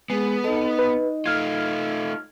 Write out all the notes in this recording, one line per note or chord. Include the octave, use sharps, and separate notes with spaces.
G#3 B3 G#4
D#4 A4 D#5
B4
A3 F4 F6 G#6